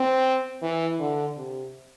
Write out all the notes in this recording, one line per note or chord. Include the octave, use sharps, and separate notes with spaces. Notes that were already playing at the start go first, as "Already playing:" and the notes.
Already playing: C4
E3
D3
C3